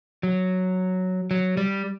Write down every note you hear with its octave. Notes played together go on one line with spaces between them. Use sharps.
F#3
F#3
G3